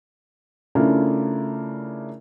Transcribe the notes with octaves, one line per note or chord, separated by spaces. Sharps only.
C#3 A3 D4 E4 F4 A#4